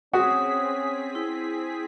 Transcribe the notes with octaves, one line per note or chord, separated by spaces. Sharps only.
C4 C#4 F#4 G#4 D#6 B6
E4